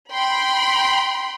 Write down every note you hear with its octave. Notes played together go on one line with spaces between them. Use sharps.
G5 B5 C6